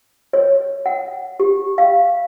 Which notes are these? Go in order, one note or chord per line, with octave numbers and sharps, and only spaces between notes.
C#5
F#5
G4
F5